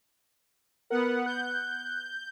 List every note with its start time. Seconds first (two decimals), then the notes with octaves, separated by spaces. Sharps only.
0.90 B3 A#4 F#5
1.26 F#6 G6